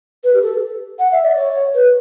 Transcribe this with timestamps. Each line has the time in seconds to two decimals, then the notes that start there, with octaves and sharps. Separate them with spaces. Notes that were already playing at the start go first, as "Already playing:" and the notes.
0.23 B4
0.34 G4
0.42 A4
0.99 F#5
1.12 E5
1.24 D5
1.36 C#5
1.74 B4